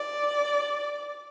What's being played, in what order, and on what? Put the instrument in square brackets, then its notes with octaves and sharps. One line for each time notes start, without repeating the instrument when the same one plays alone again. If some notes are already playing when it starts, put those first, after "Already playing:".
Already playing: [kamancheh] D5